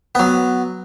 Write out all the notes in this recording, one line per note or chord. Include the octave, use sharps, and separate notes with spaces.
F#3 B3